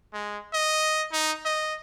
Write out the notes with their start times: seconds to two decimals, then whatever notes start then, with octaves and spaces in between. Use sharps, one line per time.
0.13 G#3
0.53 D#5
1.12 D#4
1.45 D#5